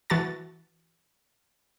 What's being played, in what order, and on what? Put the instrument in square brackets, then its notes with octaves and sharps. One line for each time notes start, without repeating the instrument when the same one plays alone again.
[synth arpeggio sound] E3 F#4 A5 A6